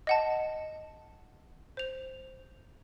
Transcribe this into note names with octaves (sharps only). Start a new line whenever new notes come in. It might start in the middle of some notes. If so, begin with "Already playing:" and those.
D#5 F#5 A5
C5 F7